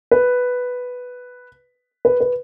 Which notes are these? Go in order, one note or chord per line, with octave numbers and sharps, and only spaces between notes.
B4
B4
B4